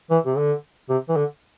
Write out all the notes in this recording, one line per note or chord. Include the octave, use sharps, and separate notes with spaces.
E3
C3
D3
C3
E3
D3